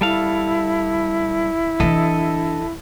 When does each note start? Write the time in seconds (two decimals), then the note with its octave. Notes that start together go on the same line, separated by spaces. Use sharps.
0.01 G3 E4 A4 F5
1.80 E3 D4 A4 D#5